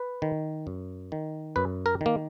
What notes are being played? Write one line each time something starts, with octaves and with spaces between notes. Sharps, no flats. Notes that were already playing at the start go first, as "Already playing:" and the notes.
Already playing: B4
D#3
F#2
D#3
F#2 B4
A#4
D#3 A#3